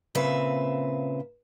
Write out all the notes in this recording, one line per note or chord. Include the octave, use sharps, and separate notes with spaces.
A#2 C#3 C4 B4 E5